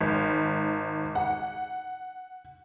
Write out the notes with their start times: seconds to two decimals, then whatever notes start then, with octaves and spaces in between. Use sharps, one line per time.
0.01 G#1
1.15 F#5